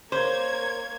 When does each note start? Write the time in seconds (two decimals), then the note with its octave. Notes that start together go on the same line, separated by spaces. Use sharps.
0.12 A#3 C5 C#5 G#6